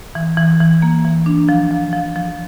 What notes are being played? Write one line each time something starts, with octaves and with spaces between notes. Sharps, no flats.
E3
E3
E3
A#3
E3
D4
F3
F3
F3
F3